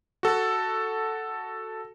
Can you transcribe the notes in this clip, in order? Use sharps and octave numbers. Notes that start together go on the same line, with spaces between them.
F#4 A4